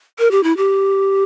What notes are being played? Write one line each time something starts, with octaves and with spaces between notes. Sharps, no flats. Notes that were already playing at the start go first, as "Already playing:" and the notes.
A#4
G4
E4
G4